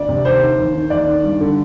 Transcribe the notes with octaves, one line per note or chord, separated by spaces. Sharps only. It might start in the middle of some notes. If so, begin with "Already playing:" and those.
Already playing: D2 D5
C3
D#2 C5
D#3
D#2
D#3
D#2 D5
D#3
G2
D3